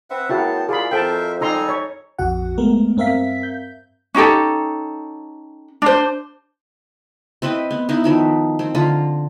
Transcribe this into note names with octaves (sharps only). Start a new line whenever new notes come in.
C4 B4 E5 F#5
B3 E4 F#4 G#4 A#4 C#5 G5 A5
F4 G#4 A#4 D5 B5
F2 A#4 C5 E5 G5 A5
G3 D#4 A4 G#5 A#5 C6
C#5
A#1 F2 F#4 F#5
G#3 A3 B3 A#4
G2 C4 A#4 E5 F5 B6
G6
C#4 D#4 G4 A4
D4 C5
C4 E4 B4 D#5
B3
B3 D#4 E4
D#3 F3 E4
C4
D3 F4 A#5